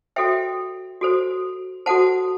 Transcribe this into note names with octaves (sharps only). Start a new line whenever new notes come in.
F#4 A4 C5 E5 G5
F#4 A4 C5
F#4 A4 C5 F#5 A5